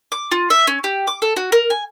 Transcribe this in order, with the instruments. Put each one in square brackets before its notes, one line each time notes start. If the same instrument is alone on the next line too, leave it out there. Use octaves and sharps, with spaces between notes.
[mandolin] D6
F4
E5
C#4
G4
D6
A4
F#4
A#4
G#5